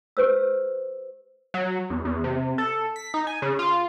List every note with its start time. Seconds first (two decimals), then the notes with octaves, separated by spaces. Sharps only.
0.17 G4 B4 C5 E6
1.54 F#3
1.90 E2
2.05 E2
2.24 C3
2.58 A4
2.96 B6
3.14 D#4
3.27 G#5
3.42 C#3
3.59 F4